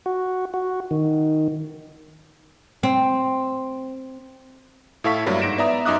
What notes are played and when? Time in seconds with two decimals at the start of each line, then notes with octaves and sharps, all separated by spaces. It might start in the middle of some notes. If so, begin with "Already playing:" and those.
0.06 F#4
0.54 F#4
0.91 D#3
2.83 C4
5.04 A2 E4 A4 F5 C#6 B6
5.26 G2 F#3 G3 A#3 E4
5.42 G#2 A#6 D7 E7
5.58 B3 D5 E5 A#5 D#6
5.86 F#2 D#4 E5 D6 D#6 F#6